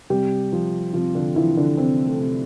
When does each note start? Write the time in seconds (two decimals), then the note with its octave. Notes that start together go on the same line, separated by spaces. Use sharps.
0.10 C3 G3 G4
0.52 F3
0.93 C3 F3 F4
1.15 D3 D4
1.35 E3 F3 E4
1.57 D3 D4
1.77 C3 C4
2.06 A3
2.19 C3